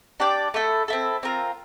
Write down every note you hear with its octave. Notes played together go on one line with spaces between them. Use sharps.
D4 G4 D5 G5
A3 E4 A4
C4 E4 A4
C4 F4 A#4